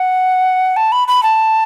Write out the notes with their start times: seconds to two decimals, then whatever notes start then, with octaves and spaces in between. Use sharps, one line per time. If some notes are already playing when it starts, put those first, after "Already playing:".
Already playing: F#5
0.76 A5
0.92 B5
1.08 B5
1.23 A5